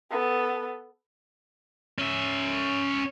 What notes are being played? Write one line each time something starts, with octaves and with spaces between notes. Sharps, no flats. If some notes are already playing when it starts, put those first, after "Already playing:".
B3 A4
C#4 E5